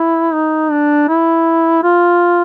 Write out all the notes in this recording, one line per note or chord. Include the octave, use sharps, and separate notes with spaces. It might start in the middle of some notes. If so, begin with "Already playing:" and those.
Already playing: E4
D#4
D4
E4
F4